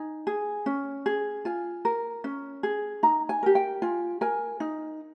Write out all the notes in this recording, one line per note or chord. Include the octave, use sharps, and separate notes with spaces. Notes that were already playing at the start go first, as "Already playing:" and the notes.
Already playing: D#4 G#5
G#4
C#4
G#4
F4 G#5
A#4
C#4
G#4
D#4 A#5
G#5
G4 A#4
G5
F4 G#5
A#4 G#5
D#4